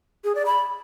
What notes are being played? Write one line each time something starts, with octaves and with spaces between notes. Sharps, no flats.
G#4
D5
B5